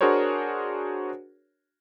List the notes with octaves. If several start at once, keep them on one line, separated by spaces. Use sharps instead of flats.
D4 F#4 G#4 A#4 C5 C#5